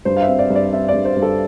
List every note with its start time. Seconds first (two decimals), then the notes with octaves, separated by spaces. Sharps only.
0.05 G2 C5
0.17 F5
0.23 E5
0.28 C4
0.39 D5
0.50 G2
0.55 D5
0.72 C4 E5
0.88 D5
0.94 G2
1.05 C5
1.17 G2
1.22 A4